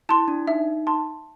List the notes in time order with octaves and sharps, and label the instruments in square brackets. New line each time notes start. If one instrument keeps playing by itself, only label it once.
[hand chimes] E4 [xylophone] A5 C6
[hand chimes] D4
[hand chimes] D#4 [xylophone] E5
[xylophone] A5 C6